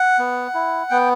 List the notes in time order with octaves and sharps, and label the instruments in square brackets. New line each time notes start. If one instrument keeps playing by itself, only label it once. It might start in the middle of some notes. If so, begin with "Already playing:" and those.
Already playing: [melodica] F#5
B3
E4
B3 G5